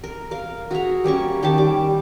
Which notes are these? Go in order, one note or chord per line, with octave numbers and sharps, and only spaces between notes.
A#4
A#4 F5
F#4 G#4 E5 A#5
G3 A#3 C#4 C#6
D#3 C#4 G4 A5
G3 D6